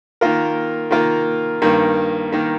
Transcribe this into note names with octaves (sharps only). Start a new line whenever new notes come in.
D#3 A#3 F4 A#4
D#3 A#3 F4 A#4
G2 D#3 A#3
D#3 A#3